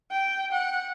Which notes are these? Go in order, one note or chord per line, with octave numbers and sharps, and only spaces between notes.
G5
F#5